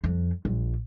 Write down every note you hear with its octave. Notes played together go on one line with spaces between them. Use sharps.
F2
A#1